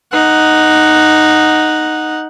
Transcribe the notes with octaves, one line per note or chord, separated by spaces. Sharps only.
D#4 F#5